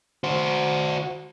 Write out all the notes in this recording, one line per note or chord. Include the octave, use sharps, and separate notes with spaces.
F#4 C5